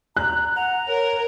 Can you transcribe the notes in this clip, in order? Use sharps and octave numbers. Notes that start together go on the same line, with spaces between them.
A#5 F#6
F#5 A#5
A#4 C#5